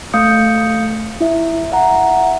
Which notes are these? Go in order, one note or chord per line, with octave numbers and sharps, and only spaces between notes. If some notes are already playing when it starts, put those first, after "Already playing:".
A3 F5 D6 D#6 G6 C#7
E4 E5
E5 F#5 A#5